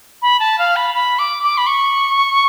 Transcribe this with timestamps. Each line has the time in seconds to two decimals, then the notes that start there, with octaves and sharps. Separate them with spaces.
0.22 B5
0.40 A5
0.59 F5
0.76 B5
0.95 B5
1.19 D6
1.43 D6
1.58 B5
1.67 C#6